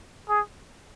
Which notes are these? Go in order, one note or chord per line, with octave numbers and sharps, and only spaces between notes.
G#4